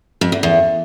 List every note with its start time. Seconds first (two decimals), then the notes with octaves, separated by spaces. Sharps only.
0.21 F2
0.32 E2
0.43 E2